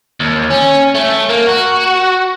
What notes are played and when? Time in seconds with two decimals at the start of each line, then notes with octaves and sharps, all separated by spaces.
0.20 D#2
0.50 C#4
0.95 A3
1.29 A#3
1.47 F#4